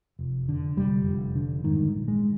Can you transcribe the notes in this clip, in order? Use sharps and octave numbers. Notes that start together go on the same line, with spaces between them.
F1
D3
F1 G3
F1
D3
G#2 D#3
A#1
G#3